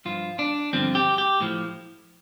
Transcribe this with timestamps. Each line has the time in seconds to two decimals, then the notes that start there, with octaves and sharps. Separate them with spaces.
0.05 G2 F3 F4
0.39 D4
0.73 G2 D3 F3 C4
0.95 G4
1.18 G4
1.41 A2 F3